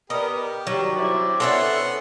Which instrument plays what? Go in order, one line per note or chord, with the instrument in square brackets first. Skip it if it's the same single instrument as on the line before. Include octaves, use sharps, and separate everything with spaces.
[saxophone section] B3 A#4 [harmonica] G4 [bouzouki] D#5
[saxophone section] D#3 G3 [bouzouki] F#3
[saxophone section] C4 D4 E4 [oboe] D5
[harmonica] B3 C#4 F#5 [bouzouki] A4 C#5 E5 [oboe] C6